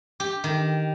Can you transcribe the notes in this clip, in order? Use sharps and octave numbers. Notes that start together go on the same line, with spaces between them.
G4
D#3